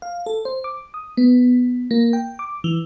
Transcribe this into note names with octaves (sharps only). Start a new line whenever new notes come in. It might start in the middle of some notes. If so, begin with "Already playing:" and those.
F5
A4
C5
D6
D#6
B3
A#3
G5
D6
E3